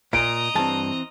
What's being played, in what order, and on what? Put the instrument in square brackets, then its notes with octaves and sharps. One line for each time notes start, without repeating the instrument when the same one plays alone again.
[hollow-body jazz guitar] A#2 [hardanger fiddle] D#5 A#5 [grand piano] D7
[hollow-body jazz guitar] G2 A5 [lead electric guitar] E3 C4